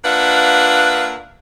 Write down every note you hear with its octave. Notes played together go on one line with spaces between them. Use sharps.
A#3 D4 F4 B4 E5 F#5